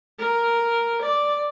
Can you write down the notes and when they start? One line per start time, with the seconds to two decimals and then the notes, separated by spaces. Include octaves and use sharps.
0.19 A#4
1.01 D5